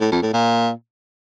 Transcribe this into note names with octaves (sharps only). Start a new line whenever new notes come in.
A2
F2
A2
A#2